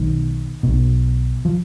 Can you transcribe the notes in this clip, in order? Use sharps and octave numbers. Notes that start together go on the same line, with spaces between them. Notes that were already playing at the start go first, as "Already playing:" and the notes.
Already playing: B1 B2 D#3
B1 B2
F3